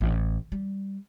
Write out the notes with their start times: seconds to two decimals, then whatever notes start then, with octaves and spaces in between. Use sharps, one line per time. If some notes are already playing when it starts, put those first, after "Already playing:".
0.01 A1
0.52 G3